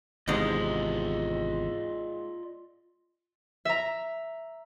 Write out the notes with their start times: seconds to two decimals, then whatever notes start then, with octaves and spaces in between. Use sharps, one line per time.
0.28 G#1 E2 G#2 C3 G#3 F4 D5 D#5
3.65 E5 A#5